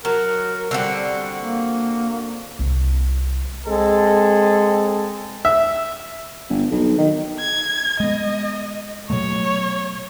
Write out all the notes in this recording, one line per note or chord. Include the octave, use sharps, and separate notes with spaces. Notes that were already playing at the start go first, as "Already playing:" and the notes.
F#3 A#4
D3 G3 C4 F#4
A#3
C2 E4
G#3 C4 A4
E5
G1
B1
D#3
G#6
G#3 B3 D#5
B2 F#3 A3 C#5